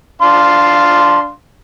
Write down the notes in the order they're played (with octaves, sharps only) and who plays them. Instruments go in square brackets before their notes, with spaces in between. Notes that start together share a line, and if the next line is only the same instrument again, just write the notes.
[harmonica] D4 F5 C6